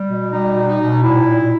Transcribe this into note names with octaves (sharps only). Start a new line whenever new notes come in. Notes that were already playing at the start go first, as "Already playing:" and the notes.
Already playing: G3
B2
G3 D#4
B2
D#4
B2
A#2 E4
A#2